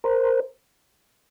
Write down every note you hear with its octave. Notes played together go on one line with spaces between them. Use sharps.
A#4 C5